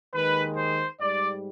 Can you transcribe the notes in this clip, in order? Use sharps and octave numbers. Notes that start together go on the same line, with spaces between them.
D#2 D#3 G#3 B4
C5
G#2 G3 D5